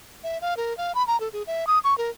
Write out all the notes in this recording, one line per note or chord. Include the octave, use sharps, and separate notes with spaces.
E5
F5
A#4
F5
B5
A#5
A4
G#4
E5
D#6
C#6
A#4